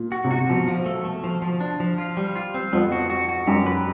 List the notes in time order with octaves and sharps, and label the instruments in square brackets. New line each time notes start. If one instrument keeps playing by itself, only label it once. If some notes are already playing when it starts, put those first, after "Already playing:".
Already playing: [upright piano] A#2
[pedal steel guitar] F#4
[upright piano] C3
[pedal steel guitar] F#4
[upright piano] B2 [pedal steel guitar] F3
[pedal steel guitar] F3
A3
A3
F3
F3
D4
F3
F4
G3
F4
C4
[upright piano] F2 [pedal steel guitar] B3
[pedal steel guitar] F#4
F#4
F#4
[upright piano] F#2 [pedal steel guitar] G4
[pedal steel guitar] B4